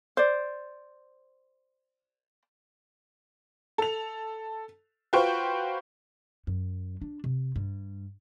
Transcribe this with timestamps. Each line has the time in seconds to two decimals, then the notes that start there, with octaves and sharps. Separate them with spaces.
0.17 C5 D5
3.78 A4 F7
5.13 F4 F#4 B4 C5 G5 C#6
6.47 F#2
7.02 D4
7.24 C3
7.56 G2